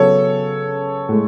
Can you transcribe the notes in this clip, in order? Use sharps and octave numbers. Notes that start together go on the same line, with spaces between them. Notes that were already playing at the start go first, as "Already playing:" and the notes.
Already playing: C#3 F#3 B3 A4 C#5
A2 G#3